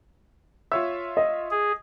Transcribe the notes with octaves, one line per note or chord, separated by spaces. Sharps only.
F4 C#5 E5 E6
D#5
G#4